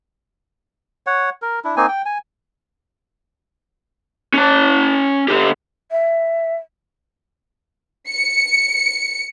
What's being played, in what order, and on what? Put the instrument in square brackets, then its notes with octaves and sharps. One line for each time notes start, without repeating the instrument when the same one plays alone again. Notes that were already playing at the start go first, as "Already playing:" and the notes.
[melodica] C#5 F#5
A#4
D4 E4
A#3 C4 D#4 G#5
G5
G#5
[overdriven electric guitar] C#4 A5
D3 G4
[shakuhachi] E5
[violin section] C#7